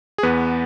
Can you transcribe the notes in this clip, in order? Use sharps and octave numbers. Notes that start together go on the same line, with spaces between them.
G#4
E2 B3 B4